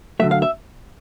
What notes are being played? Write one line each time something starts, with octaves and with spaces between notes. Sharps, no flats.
D3 F#3 A3 E5
F5
E5